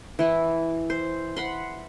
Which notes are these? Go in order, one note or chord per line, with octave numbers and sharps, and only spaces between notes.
E3 E4
C5
F#5 B5 C6